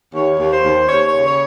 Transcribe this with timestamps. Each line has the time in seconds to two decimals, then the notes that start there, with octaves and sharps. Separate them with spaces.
0.14 D#2 C#5
0.39 D#2
0.52 C5
0.65 D#2
0.89 D#2 C#5
1.08 C#5
1.15 C#3
1.27 C#5